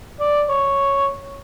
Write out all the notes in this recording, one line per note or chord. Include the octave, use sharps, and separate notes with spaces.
D5
C#5